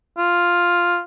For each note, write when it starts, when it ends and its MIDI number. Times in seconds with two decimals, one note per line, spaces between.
0.18 0.99 65